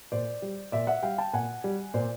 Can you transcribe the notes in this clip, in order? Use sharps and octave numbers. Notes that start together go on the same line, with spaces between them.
A#2 C5 D5
G3
A#2 D5 E5
E5 F#5
G3 F5 G5
G5 A5
A#2 F#5 G#5
G3
A#2 C5 D5